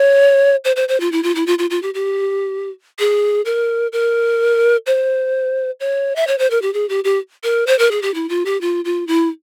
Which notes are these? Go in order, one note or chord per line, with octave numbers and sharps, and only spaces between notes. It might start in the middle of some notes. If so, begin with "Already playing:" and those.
Already playing: C#5
C5
C5
C5
F4
E4
F4
E4
F4
F4
F4
G4
G4
G#4
A#4
A#4
C5
C#5
E5
C#5
C5
A#4
G4
G#4
G4
G4
A#4
C5
A#4
G#4
G4
E4
F4
G4
F4
F4
E4